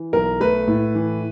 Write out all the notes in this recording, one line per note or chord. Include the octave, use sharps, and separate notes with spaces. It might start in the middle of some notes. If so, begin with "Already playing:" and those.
Already playing: E3
B1 A#4
A3 B4
A2
E3